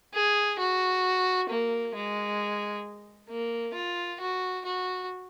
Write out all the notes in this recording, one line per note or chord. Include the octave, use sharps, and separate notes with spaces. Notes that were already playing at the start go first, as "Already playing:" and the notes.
G#4
F#4
A#3
G#3
A#3
F4
F#4
F#4